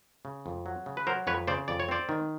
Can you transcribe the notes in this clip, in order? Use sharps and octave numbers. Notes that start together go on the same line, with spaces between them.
C#3
F2
F#3
C#3
B4
F#3 A#4 C5
F2 B4 C#5
C#3 C5 D5
F2 D5
C#5
C4 C5 D5
D#3